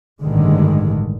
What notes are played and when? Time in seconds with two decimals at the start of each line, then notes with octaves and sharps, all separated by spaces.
0.21 A1 G2 D3 D#3 G#3